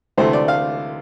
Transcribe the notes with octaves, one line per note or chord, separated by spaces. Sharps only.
D2 C3 E3 A3 C5
D5
F5